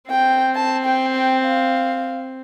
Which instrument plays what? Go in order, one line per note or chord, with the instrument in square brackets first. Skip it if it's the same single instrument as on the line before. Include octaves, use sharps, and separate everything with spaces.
[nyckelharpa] C4 [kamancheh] G5
[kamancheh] A5
G5
G5
F5